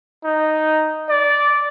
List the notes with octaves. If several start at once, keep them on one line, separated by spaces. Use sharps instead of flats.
D#4
D5